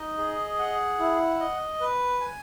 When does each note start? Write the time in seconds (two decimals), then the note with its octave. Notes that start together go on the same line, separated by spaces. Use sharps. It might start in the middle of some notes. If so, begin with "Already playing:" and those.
Already playing: D#4 D#5
0.18 G#4
0.59 F#5
0.99 E4
1.40 D#5
1.81 B4
2.21 G#5